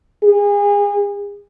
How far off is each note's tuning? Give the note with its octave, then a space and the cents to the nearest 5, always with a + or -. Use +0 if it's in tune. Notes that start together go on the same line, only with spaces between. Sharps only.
G#4 -35